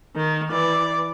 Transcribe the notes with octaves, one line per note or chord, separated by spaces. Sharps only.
D#3
E3 D5